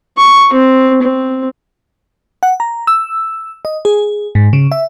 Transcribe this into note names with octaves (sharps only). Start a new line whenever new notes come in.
C#6
C4
C4
F#5
A#5
E6
D#5
G#4
G#2
C#3
E5